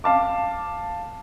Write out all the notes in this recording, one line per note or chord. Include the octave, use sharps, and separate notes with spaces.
F5 A5 D6